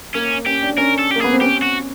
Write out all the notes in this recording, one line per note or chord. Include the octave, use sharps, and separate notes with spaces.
A#3 C#4
C#4 G4
D4
C#4 A#4
A4
G4
A#3
B3 G#4
C4
C#4 G4
F#4